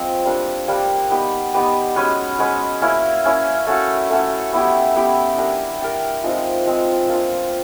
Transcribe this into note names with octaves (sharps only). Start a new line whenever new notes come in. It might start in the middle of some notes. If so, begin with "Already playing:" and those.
Already playing: F3 G#3 C4
G3 A#3 D4
G3 A#3 D4
B3 D#4 G4 B4
B3 D#4 G4 B4
G#3 C#4 F#4 B4
G#3 C#4 F#4 B4
A#3 C#4 E4
A#3 C#4 E4
A3 C#4 F#4
A3 C#4 F#4
B3 E4 G4
B3 E4 G4
D4 G4 A#4
D4 G4 A#4
F3 G#3 C4 D#4
F3 G#3 C4 D#4
A#3 D4 F4